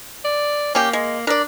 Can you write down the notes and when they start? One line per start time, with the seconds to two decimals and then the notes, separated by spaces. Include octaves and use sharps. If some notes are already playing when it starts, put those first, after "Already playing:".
0.24 D5
0.75 A#3 C#4 G4
0.93 G#3
1.27 D4 A#4 D5